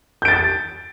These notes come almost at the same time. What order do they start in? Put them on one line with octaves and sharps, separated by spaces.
G6 D7 A6